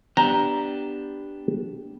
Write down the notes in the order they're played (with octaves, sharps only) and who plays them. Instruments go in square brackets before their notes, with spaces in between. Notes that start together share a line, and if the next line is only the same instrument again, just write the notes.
[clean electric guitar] B3 D4 G4 [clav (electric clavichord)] A#5